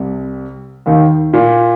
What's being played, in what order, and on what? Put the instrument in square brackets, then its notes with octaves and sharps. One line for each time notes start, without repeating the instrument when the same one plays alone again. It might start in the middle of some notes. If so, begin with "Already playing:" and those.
Already playing: [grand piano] C2 C3
D#2 D#3
A#2